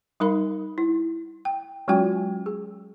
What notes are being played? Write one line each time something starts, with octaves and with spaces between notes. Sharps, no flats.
G3 D#4 A#4 F5 B5
E4
G5
F#3 G#3 C#4 F4 F#4 G5
G#4